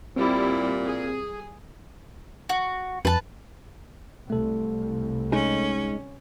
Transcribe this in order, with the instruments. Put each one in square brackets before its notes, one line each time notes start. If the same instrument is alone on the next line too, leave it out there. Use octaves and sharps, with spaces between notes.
[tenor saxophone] A#2 [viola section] G3 E4 [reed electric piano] C4
[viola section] G#4
[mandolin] F#4
[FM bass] F2 [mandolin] B4 A5
[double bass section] C2 [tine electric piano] A3 A4
[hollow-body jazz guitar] G#3 D#4 G#4 [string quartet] C#4